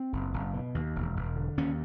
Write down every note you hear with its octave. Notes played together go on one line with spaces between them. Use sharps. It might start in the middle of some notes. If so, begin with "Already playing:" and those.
Already playing: C4
F#1
F#1
B2
D#2
E1
E1
D3
D#2 C#4